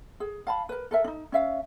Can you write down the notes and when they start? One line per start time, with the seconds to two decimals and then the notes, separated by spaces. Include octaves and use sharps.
0.20 G#4
0.47 F5 A5 B5
0.69 A#4 B4
0.91 A4 A#4 E5
1.04 D4 D#4
1.32 C#4 E5 F5